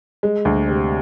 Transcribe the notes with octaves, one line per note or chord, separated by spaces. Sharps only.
G#3
D2
C3